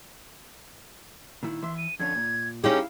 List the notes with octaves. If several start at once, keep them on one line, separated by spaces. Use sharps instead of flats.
A#2 D#3 E4
E3 E5 C6
D#7
F2 D3 C#4 G#6
A#2
C#4 D#4 E4 G4 G#4 F5